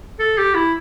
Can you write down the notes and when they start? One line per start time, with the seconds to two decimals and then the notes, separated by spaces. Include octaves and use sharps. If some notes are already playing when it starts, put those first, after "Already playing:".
0.19 A4
0.38 G4
0.55 E4